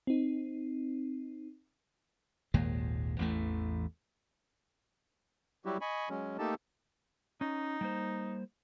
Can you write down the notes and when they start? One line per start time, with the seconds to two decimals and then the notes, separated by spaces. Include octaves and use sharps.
0.07 C4 D#4
2.54 G#1 D#2 A#2 G#3
3.19 A1 E2 A2 A3
5.65 F#3 G3 E4 F#4 G4
5.81 D#5 G#5 B5 C#6
6.09 F#3 G#3 C#4
6.39 A3 A#3 D#4 G4 A4 A5
7.41 C#4 D#4
7.81 G3 A#3 C5